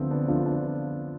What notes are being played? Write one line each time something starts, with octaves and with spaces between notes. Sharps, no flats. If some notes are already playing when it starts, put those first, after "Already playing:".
Already playing: D2 D3 F3 B3 C4
B3 D4
D2 D3 F3 D4 F4
D4 F4